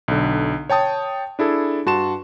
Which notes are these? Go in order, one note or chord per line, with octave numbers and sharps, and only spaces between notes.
B1 D3
C#5 G5 A5 D#6
D4 E4 G#4 A4
G2 F#4 A5 C6 E7